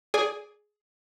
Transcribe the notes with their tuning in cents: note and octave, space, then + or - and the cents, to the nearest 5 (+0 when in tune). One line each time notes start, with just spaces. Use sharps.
G#4 +10 D5 +0 G#5 -10